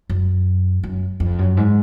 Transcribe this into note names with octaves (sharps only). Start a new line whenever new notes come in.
F#2
F#2
F2
F#2
G#2